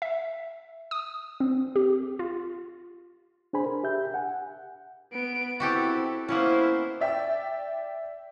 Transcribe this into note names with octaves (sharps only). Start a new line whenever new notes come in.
E5
D#6
C4
G4
F4
D4 G#4 C5 G#5 B5
A#4
G4 E5 G6
F#5 G#5
B3 D7
C4 E4 F#4 G4 A4
A#3 B3 C#4 E4 C5
D5 E5 G5